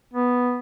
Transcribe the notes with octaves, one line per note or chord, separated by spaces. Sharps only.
B3